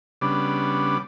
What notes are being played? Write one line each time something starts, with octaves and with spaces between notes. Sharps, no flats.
C#3 G3 B3 D4